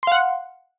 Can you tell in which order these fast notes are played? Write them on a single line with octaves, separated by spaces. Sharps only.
C6 F5 F#5